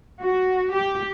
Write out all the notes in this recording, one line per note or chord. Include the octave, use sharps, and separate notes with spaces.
F#4
G4